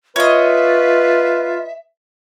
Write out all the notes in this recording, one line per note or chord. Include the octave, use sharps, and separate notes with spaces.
F4 B4 C#5 D#5 E5